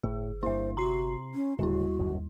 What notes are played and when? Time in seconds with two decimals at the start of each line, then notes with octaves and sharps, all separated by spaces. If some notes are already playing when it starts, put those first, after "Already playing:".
0.03 G1 A2 G#4
0.43 G2 A#3 E4 C5 E5
0.77 C3 F#4 A#5 C6 C7
1.34 C#4
1.59 D1 D#2 C#3 G3 E4 F#4
1.99 G1 F#2 D#3